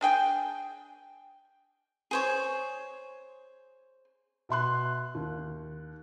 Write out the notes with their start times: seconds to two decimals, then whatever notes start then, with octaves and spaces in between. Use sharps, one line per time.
0.01 D4 G#4 G5 G#5
2.11 G#4 C5 C#5
4.49 B2 E5 C6 F#6
5.15 D#2